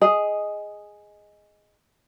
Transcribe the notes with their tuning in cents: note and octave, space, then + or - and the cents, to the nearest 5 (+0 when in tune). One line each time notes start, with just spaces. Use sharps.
G#4 +0 D#5 +0